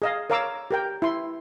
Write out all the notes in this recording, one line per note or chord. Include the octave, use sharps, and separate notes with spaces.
G#4 D#5 F5
A#4 C#5 F5 A#5 D6 E6
G4 A#4 G5
E4 C6